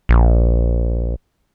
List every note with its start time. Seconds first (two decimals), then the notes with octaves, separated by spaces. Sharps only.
0.09 A#1